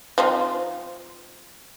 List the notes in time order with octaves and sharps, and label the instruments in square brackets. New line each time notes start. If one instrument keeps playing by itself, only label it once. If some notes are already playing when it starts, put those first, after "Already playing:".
[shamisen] F3 C4 D#4